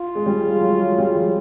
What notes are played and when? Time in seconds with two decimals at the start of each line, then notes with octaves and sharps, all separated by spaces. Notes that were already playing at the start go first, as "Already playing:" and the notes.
Already playing: F4
0.15 G#3
0.26 G3
0.61 F#3
0.79 G#3
0.98 G3
1.15 F3